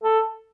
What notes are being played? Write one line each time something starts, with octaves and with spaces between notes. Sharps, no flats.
A4